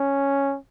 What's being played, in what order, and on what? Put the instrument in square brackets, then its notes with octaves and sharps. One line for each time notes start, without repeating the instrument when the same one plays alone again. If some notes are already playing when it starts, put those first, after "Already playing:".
Already playing: [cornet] C#4